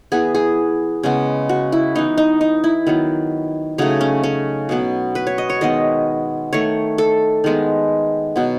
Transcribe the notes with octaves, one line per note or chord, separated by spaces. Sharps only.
E3 B3 G#4
G#4
C#3 G#3 B3
F#4
E4
E3 B3 D#4
D#4
D#4
E4
D#3 F#3 B3
C#3 F#3 A3 D#4
C#4
C#4
B2 F#3 B3
B4
C#5
D#5
C#5
D#3 G#3 B3 D#5
D#3 A3 C#5
A4
D#3 G#3 B3
B2 F#3 B3